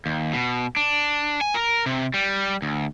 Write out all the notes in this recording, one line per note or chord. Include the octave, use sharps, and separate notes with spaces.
D#2
B2
D4
G#5
A#4
C3
G3
D2